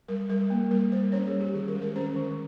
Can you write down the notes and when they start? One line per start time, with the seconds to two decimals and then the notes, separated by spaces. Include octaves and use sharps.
0.08 G3 A#4
0.29 G3 A#4
0.50 A#3
0.71 G3 A#4
0.91 G3 C5
1.12 C#4 C#5
1.27 G#4
1.33 G3
1.40 G4
1.54 D#3 G#4
1.68 A#4
1.75 G#3
1.82 A#4
1.96 C#4 C5
2.16 D#3